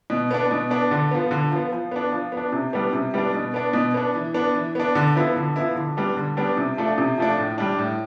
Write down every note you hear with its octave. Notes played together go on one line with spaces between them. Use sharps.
B2
B3 D4
B2
B3 D4
D3
F3 B3
D3
F3 B3
F3
B3 D4
F3
B3
D4
C3
G3 B3 D4
C3
G3 B3 D4
B2
B3 D4
B2
B3 D4
E3
B3 D4
E3
B3 D4
D3
F3 B3 E4
D3
F3 B3 E4
D3
G3 B3 D4
D3
G3 B3 D4
C3
F3 A3 D4
C3
F3 A3 D4
A2
G3 D4
A2